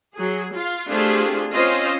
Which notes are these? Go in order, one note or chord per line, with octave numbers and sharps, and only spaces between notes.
F#3 G#4
F4 F5
A3 C4 D4 F4 G4 G#4
C4 C#4 F4 C5 D#5 F5